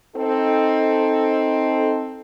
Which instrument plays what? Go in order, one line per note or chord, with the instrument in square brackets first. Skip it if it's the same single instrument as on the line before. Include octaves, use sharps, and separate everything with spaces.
[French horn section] C4 D#4 A4